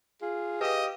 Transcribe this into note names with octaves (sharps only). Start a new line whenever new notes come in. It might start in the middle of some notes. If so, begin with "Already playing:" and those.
F4 G#4
G4 B4 D#5 F5